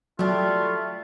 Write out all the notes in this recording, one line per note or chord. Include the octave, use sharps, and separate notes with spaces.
F#3 G3 A3 D4 F4